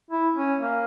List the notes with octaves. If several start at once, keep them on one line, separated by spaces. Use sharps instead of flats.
E4
C#4
A#3